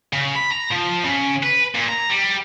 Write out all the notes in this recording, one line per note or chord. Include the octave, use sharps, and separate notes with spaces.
C#3
B5
A#5
F3
C#3
B4
A#2
A#5
G3